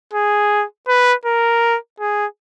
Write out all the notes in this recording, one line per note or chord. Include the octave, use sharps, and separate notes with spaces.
G#4
B4
A#4
G#4